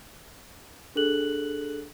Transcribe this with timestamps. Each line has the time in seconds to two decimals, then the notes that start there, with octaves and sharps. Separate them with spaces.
0.95 D4 G#4 A4 F#6 F#7